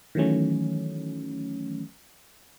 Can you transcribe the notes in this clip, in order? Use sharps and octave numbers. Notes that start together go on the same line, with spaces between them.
D#3 E3 F#3 A3 C#4